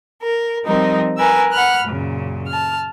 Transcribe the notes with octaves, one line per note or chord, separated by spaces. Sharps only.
A#4
F3 G3 C4 D#4 A#4 D#5
A#4 B4 G#5 E6
F#5 B5 F6 F#6
F#2 A#2 C#3
A5 F6